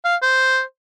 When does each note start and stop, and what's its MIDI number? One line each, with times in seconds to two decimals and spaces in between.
0.05 0.15 77
0.22 0.61 72